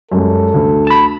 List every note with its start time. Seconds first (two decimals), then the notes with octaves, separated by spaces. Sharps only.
0.12 F#2 G3 G#3 A4
0.54 D2
0.87 A5 B5